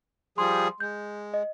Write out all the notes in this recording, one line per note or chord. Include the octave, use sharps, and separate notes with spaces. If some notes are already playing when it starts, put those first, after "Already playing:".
F3 G3 G#4 C6
G#3 G6
D#5